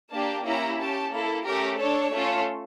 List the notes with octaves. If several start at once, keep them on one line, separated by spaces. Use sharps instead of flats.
A#3 D4 G4 A5
A#3 C#4 E4 G4 A#5
C#4 G4 A5
A#3 E4 A4
A3 C#4 G4 A#4
D4 A4 C#5
A3 C#4 F4 A4